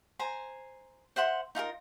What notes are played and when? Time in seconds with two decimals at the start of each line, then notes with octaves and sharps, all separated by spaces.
0.19 C5 G#5 A#5
1.16 C5 E5 F#5 C6
1.55 D#4 F4 G#4 A#4